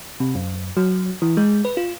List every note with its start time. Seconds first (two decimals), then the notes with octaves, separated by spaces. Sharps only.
0.20 C3
0.35 F#2
0.77 F#3
1.22 E3
1.37 G#3
1.65 B4
1.77 F4